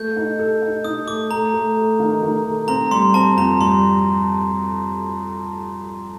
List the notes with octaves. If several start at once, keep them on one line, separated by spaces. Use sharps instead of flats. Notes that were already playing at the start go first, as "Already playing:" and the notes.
Already playing: A3 G6
D#4
A4
D#4
D#4 D#6
A3 D6
A3 A#5
A3
A3
D#3
D#3
A3
C4 A#5
G3 C6
C4 A5
F2 A#5
G3 C6